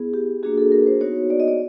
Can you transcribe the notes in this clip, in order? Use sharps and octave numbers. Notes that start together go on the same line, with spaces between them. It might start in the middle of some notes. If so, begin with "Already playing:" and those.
Already playing: B3 E4 G#4
G4
A#3 D4 F#4 G#4
A4
A#4
C5
B3 D#4 F#4 C#5
D5
D#5
D5